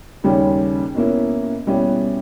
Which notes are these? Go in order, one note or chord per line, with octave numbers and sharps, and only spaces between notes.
D#2 C#3 G3 C#4
B2 A#3 C#4 E4
B2 G3 C#4 E4